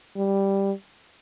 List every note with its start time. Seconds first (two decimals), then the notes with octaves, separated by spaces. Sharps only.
0.16 G3